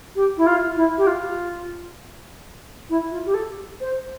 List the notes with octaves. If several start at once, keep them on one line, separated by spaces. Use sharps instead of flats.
G4
E4
F4
E4
G4
F4
E4
F4
G4
A4
C5